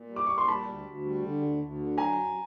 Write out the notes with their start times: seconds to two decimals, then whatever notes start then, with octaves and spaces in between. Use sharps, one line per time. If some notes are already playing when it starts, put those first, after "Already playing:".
Already playing: A#2
0.09 G3
0.16 D6
0.27 A#2 C#6
0.38 C6
0.47 G3 A5 B5
0.66 D2
0.85 D2
1.04 G3
1.22 D3
1.42 D2
1.60 D2
1.78 D3
1.97 F#3 G#5 A#5
2.17 F#2